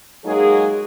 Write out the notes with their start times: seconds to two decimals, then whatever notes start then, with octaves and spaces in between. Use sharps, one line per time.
0.25 F#3 G#3 A#3 D#4 G#4